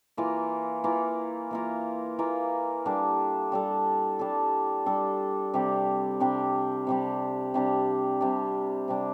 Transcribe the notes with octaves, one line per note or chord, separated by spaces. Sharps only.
E3 A#3 F4 A#4
E3 A#3 F4 A#4
E3 A#3 F4 A#4
E3 A#3 F4 A#4
G3 D4 A4
G3 D4 A4
G3 D4 A4
G3 D4 A4
C3 G3 D4 G4
C3 G3 D4 G4
C3 G3 D4 G4
C3 G3 D4 G4
C3 G3 D4
C3 G3 D4